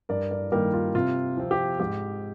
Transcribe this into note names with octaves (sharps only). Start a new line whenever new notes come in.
G2 A#4 D5
A#4 D5
D#3 G3 A#3 G4 A#4
F4
C3 F4
F3 C4
G4
G#2 G4